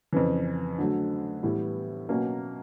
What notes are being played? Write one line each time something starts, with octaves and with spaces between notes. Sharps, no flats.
F2 C#3 E3
D3 F#3 A3
A2 E3 G3 B3 E4
B2 F#3 A#3 C#4